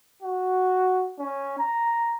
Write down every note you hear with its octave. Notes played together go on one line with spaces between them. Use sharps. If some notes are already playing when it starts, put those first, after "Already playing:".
F#4
C#4
A#5